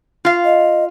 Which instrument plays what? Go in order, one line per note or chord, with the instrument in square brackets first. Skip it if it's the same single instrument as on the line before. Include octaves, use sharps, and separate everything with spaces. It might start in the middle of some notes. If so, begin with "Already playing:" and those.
[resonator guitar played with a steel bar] F4 F5
[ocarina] D#5